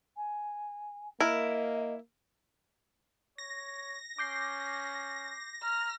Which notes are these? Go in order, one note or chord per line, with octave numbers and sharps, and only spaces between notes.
G#5
A#3 E4 A#4 D#5
C#5 A#6
C#4 D6 G6 C7
A#5 F6